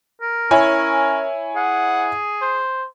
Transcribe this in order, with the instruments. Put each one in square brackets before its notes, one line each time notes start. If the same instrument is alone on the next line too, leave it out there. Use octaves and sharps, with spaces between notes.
[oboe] A#4
[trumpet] C#4 [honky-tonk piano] E4 C#5 G#5
[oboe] G#4 [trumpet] F#5
[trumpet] C5